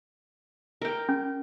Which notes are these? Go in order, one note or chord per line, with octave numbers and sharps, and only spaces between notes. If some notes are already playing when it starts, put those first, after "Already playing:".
A#4 G5
C#4